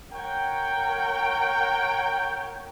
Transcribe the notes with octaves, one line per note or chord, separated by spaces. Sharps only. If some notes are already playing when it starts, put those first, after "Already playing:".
A#4 C#5 F#5 G5